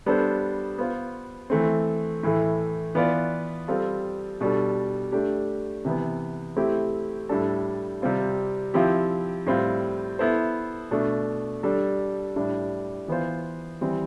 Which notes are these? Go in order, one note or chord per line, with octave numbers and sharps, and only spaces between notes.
G3 B3 D4 A4 C5
B3 F4 C5
E3 A3 C4
A2 E3 A3
E3 B3 F4 B4 D5
G3 C4 F4 A4
B2 G3 D4 A4
A3 D4 G4
C3 E3 B3
A3 C4 E4 G4
A2 G3 D4 A4
C3 G3 C4 F4
F3 C4 E4 G4
A2 G3 C4 F4
B3 E4 A4 C5
B2 A3 D4
G3 D4 A4
A2 G3 D4
E3 B3 F4 C5
E3 G3 C4